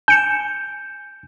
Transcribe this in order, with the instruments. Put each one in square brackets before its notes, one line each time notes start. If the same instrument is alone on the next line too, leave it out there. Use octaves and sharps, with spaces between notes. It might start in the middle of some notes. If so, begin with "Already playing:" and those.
[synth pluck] G#5 C#7 E7 [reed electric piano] G6